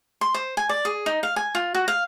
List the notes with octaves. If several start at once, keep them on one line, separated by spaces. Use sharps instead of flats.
C6
C5
G#5
D5
G#4
D#4
F5
G#5
F4
F#4
F5